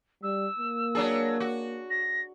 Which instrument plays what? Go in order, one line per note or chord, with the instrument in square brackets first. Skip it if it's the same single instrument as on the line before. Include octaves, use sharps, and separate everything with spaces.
[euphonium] G3 [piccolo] E6
[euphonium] A#3
[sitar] F#3 D4 G#4
F#4
[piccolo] A#6